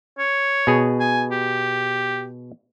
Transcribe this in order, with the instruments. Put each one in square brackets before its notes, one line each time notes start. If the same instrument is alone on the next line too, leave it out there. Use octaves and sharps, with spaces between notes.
[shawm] C#5
[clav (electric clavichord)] B2 G#4
[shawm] G#5
G4